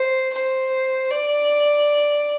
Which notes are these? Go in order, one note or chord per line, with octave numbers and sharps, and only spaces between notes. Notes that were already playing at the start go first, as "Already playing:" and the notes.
Already playing: C5
C5
D5